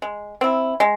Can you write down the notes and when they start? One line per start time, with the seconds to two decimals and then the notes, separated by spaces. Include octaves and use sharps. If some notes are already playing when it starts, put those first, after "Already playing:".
0.02 G#3
0.41 C4 E4
0.80 G#3